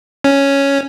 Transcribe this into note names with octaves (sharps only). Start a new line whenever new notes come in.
C#4